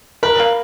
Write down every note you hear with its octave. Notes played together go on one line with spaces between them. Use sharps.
A#4 B4
A#3